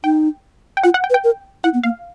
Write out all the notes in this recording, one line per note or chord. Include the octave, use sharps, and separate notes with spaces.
D#4 G5
G5
F4 F#5
F#5
G5
B4
G5
A#4
E4 F#5
B3
A#3 F5